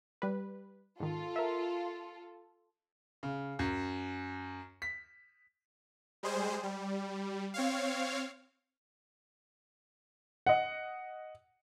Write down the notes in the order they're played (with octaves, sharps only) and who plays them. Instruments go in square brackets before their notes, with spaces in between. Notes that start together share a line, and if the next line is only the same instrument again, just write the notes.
[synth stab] G3 B4
[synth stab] G#2 D#3 [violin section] F4 A4
[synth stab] A#4 E5
[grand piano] C#3
F#2
B6
[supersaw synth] G3 G#3 G#4 C5
G3
C4 C#5 F5
[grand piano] D#5 F#5